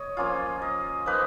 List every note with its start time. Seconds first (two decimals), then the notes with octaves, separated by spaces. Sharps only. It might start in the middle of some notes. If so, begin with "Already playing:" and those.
Already playing: C#5 D#5
0.17 F3 A#3 C#4 F4
0.62 D#5
1.06 F3 A#3 D#4 B4